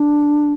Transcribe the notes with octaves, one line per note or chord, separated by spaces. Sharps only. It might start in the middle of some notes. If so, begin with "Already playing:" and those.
Already playing: D4